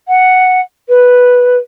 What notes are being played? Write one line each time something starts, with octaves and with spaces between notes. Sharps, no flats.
F#5
B4